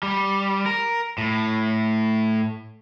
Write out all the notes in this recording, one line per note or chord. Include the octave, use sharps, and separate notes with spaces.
G3
A#4
A2